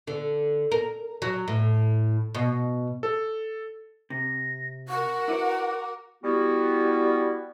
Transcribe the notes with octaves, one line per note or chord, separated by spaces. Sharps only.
D3
A#4
F#3
A2
B2
A4
C3 A#6
F#4 A#4 F#5 C#6
E4 B4 C#5 D6
G3 B3 E4 F#4